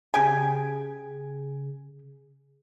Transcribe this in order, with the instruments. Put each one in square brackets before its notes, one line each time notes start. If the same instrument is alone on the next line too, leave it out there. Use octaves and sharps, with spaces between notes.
[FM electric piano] C#3 G#4 [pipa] G4 G5 G#5